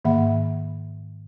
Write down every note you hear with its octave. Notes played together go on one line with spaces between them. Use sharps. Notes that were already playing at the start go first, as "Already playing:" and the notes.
G#2 D#3 A#3 E5 F#5 B5